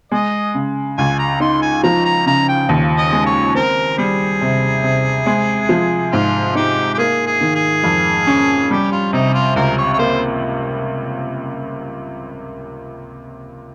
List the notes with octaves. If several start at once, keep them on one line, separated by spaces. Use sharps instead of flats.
G#3 D#5
C#3
C#2 G#5
A#5
D#4 C6
G#5
F3 A#5
A#5
C#3 A#5
G5
D#2
D#5
G#3
C#5
C4 A#4
G3 G#4
C3
C3
G#3
F3
G#2 F4
D#4 G4
G4
A#3 G#4
G#4
D#3
G#4
F2
C#4
G3 G4
F4
C3 D#4
F4
C#2 A#4
C#5
C#5
A#3 C5